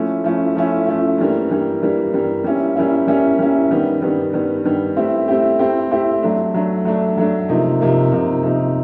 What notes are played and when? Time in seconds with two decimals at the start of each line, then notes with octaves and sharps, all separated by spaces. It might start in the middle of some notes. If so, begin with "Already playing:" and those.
Already playing: F3 A3 C#4 E4
0.24 F3 A3 C#4 E4
0.55 F3 A3 C#4 E4
0.87 F3 A3 C#4 E4
1.18 G2 E3 G3 A#3
1.50 G2 E3 G3 A#3
1.81 G2 E3 G3 A#3
2.13 G2 E3 G3 A#3
2.44 G3 A#3 C#4 E4
2.76 G3 A#3 C#4 E4
3.08 G3 A#3 C#4 E4
3.39 G3 A#3 C#4 E4
3.71 G2 D#3 G3 B3
4.02 G2 D#3 G3 B3
4.33 G2 D#3 G3 B3
4.65 G2 D#3 G3 B3
4.97 A3 C4 E4 G4
5.28 A3 C4 E4 G4
5.59 A3 C4 E4 G4
5.91 A3 C4 E4 G4
6.23 F#3 A3 D4
6.54 F#3 A3 D4
6.85 F#3 A3 D4
7.17 F#3 A3 D4
7.49 C3 F3 A#3 D#4
7.80 C3 F3 A#3 D#4
8.11 C3 F3 A#3 D#4
8.43 C3 F3 A#3 D#4